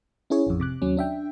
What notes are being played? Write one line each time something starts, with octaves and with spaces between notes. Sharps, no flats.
C#4 E4 G#4 C#5
A1 F2
C3 D6 F#6
D#2 F#3 C#4
D4 E5 G5